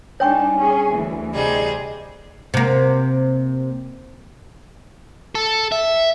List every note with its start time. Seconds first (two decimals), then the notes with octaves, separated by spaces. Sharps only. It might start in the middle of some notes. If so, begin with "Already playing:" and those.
0.20 G3 D4 D#4 C#5 G5 G#5 C#6
0.57 C#4 G#4
0.89 D2 E3
1.33 C3 G3 G#4 D#5
2.54 C3 A#3
5.35 A4
5.72 E5